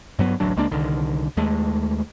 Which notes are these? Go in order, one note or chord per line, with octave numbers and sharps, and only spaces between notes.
G2 F#3 B3
A1 D2 F#3 D4
C#2 G#3 A#3 D4
C2 D3 D#3
D#2 G#3 A3